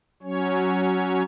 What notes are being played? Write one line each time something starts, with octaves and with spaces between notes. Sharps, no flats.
F#3 C#4 C#5